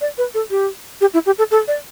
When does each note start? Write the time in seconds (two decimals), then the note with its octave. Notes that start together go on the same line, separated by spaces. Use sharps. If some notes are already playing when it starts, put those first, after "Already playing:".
0.01 D5
0.18 B4
0.34 A4
0.50 G4
1.01 G4
1.14 E4
1.26 G4
1.38 A4
1.51 A4
1.68 D5